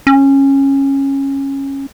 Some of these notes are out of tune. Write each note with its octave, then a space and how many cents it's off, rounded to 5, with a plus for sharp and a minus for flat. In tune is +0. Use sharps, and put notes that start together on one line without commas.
C#4 -15